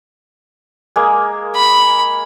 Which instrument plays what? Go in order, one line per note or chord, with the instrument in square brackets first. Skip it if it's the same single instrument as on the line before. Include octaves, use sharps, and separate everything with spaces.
[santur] G#3 A#3
[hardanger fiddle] B5